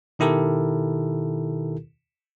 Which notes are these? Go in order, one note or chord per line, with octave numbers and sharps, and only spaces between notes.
B2 D#3 E4 G4 A4 A#4